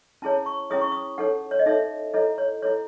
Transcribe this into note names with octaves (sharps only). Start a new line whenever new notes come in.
C#4 E4 G#4 C#5 A5
C#6
C#4 E4 G#4 C#5 D#6
C#6
D#6
D#4 A4 C#5 F#5
C#5
D#5
D#4 A4 C#5 E5
E4 A4 C#5 D#5
C#5
E4 A4 C#5